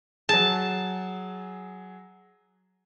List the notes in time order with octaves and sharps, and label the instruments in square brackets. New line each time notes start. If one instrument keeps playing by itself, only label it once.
[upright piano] F#3 G#4 [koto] A5